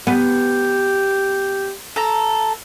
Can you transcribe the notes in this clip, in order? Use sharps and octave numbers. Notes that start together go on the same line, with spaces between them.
B3 G4
A4 A#5